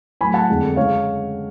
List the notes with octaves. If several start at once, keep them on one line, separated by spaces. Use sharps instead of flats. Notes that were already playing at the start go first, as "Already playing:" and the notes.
A2 F#3 A3 G#5 B5
F#5 A5
F2 D3 G#3
C#3 G#3 C#5 F5